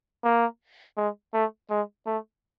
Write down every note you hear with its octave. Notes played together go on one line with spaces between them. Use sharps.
A#3
G#3
A3
G#3
A3